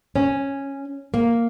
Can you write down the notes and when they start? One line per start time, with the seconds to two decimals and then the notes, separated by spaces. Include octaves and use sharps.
0.16 C#4
1.14 A#3